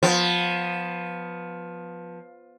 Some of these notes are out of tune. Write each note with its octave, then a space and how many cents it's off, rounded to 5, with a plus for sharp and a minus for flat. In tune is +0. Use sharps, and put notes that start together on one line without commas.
F3 +15 B3 +0